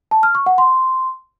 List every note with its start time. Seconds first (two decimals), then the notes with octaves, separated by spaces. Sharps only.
0.11 A5
0.23 F6
0.35 C#6
0.46 F#5
0.58 C6